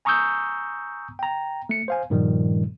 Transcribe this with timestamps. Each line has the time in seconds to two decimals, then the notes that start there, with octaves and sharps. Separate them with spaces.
0.05 G#5 A#5 C#6 D#6 E6 G6
1.19 G5 A#5
1.69 A3 C#7
1.88 C5 F5 G#5
2.10 G2 A#2 D#3 F3 G3